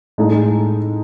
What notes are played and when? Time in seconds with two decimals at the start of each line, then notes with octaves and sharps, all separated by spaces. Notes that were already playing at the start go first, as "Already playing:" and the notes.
0.18 A2 G#3 D#4 A4